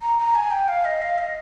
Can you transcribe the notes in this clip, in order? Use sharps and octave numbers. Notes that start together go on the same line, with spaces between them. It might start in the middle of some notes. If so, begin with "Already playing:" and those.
A#5
A#5
G#5
G5
F5
D#5
F5
D#5